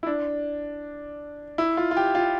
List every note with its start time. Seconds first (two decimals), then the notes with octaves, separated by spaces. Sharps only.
0.03 E4
0.07 D4
1.58 E4
1.77 F4
1.91 F4
1.97 G4
2.15 F4